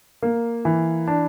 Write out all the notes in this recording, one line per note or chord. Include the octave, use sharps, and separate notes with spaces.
A#3
E3
D4